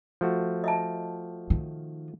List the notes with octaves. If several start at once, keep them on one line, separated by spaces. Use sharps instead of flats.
F3 A3 F#4
D#5 E5 A5
D#3